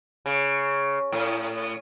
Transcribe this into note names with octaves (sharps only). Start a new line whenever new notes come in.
C#3
A2